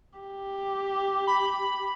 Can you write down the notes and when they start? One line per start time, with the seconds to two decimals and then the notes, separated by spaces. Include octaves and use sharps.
0.19 G4
1.27 B5